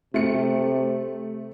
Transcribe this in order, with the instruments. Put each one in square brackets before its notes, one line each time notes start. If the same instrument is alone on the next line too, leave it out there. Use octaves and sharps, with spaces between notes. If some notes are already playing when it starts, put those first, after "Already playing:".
[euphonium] C3 [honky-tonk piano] A3 C#7